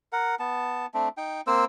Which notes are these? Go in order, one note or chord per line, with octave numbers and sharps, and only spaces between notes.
A#4 F#5
B3 A5
A3 C4 D4
D#4 G5
A#3 C4 C5 E6